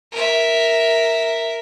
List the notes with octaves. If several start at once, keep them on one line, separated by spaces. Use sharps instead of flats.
A#4 E5